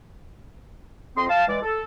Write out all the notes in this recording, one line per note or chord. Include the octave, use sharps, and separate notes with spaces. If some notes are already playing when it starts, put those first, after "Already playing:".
F2 C4 D#5 C6
F5 A5
E3 G#3 D5
A4